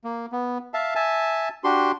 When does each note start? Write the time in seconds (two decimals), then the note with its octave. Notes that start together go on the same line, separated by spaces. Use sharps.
0.04 A#3
0.32 B3
0.74 E5 F5 A5
0.95 E5 G#5 A5
1.64 D4 F#4 G4 C6